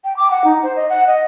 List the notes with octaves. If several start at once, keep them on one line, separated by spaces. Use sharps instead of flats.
G5
D6
F#5
D#4
C5
D#5
F#5
D#5